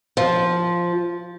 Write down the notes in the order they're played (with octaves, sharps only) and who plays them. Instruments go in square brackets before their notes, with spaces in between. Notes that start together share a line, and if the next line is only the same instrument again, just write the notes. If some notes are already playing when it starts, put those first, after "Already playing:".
[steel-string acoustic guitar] F3